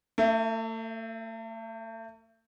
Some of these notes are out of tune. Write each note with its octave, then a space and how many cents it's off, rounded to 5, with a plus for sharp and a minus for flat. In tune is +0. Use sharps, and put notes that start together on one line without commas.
A3 +40 E5 +0